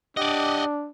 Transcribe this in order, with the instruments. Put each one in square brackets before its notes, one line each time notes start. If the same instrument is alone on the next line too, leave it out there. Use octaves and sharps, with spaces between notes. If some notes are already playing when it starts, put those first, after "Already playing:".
[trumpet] D4 [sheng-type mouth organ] G4 F#5 D#6 [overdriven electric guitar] D5 D#5